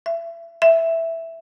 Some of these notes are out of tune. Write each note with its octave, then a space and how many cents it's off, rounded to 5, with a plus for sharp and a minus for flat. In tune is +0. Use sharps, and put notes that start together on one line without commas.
E5 +30
E5 +0